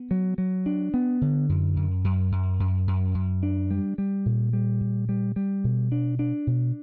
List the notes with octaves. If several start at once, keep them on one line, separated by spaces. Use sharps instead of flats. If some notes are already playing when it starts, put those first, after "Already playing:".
Already playing: B3
F#3
F#3
D4
B3
D3
F#2
F#2
F#2
F#2
F#2
F#2
F#2
D4
G3
G3
A#2
G3
A#2
G3
G3
B2
D4
D4
B2